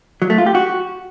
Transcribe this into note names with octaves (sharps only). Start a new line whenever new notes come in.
F#3
A3
F4
G4
F#4